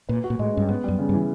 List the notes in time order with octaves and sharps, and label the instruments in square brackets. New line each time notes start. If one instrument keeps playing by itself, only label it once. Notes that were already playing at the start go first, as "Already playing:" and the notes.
[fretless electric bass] A#2 [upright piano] B4
[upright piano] F#4
[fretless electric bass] A#2
[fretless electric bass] A2 [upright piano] G#3
[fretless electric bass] G2 [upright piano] C#4
[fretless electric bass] G#2 [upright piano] B3
[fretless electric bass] F#2 [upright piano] G3
[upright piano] C#3
[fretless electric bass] G2
[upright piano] E3